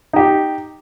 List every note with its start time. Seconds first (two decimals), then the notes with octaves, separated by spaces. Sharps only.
0.13 D#4 G4